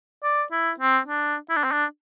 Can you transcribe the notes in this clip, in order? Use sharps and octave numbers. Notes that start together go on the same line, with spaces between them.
D5
E4
C4
D4
E4
D4
C4
D4